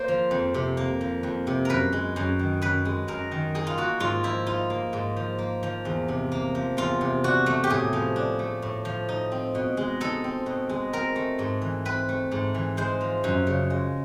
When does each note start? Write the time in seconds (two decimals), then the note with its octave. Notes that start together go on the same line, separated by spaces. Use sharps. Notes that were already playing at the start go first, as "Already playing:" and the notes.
Already playing: A#3 C5
0.08 F3
0.31 F2
0.54 C3
0.77 A#3
1.01 F3
1.23 F2
1.47 C3
1.65 F#2 A#4 B4
1.93 G#3
2.16 F#2
2.39 D#3
2.62 F#2 B4
2.85 G#3
3.08 F#2 A#4
3.32 D#3
3.55 D#4 G#4
3.67 F4
3.78 A#3 F#4
4.00 G#2 F4
4.24 F3 E4
4.46 D#4 F4
4.70 A#3
4.93 G#2
5.17 F3
5.38 A#3
5.63 F3
5.85 E2
6.08 C3
6.32 A#3
6.55 F3
6.77 E2 F4
7.01 C3
7.24 D4 F#4
7.46 A3
7.64 G4
7.70 A2 G#4
7.93 F3
8.16 D4
8.39 A3
8.62 A2
8.85 F3
9.09 D#4
9.32 C4
9.55 B2
9.77 G#3
10.00 D#4 A4
10.24 C4
10.46 B2
10.69 G#3
10.93 C4 A#4
11.16 A3
11.39 G#2
11.62 E3
11.85 C4 B4
12.09 A3
12.32 G#2
12.55 E3
12.77 G#3 C5
13.01 F3
13.24 F#2
13.47 C#3
13.70 G#3